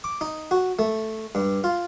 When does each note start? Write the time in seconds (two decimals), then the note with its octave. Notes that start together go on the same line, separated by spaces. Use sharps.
0.04 D6
0.21 D#4
0.51 F#4
0.79 A3
1.35 G2
1.64 F4